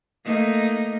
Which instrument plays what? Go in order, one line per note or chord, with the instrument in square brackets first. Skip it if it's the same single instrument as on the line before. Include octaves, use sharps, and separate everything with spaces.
[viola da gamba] A3 A#3 D#4